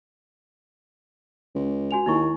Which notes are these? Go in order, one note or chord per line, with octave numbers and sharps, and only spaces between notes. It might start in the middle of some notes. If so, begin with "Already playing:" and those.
C#2
F#4 G#5 F7
D#2 D#4 E4 C#6